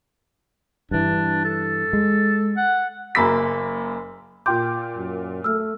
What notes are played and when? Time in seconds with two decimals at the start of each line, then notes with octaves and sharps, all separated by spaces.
0.91 G2 E3 D4
1.45 A4
1.93 G#3
2.57 F#5
3.15 F#1 F#2 A#3 B5 E6 B6
4.46 A#2 F4 G5 C6 D6 G6
4.97 F#2
5.44 A3 E6 F6